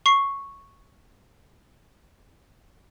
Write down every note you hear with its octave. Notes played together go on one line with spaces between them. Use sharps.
C#6 C7